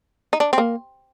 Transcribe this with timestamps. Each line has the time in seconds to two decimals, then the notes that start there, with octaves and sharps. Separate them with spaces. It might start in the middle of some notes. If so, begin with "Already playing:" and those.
0.33 D#4
0.40 D4
0.53 C4
0.58 A#3